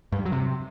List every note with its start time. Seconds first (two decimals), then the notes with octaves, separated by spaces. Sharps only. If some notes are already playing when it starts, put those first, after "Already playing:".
0.12 G2
0.19 G3
0.26 F#3
0.32 C3